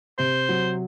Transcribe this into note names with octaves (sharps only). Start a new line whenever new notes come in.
C3 C5
F#3